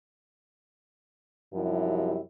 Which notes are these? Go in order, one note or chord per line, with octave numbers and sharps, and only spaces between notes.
F#2 C3 F3 G3 D#4 E4